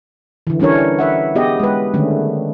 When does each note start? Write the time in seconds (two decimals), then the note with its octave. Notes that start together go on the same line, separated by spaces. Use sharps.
0.47 D3 E3
0.60 E3 G3 C#4 D4 A#4 C#5
0.99 B4 E5 F#5
1.35 B3 G4 G#4 D#5
1.60 G#3 B4
1.94 D3 D#3 G3 A3 C#4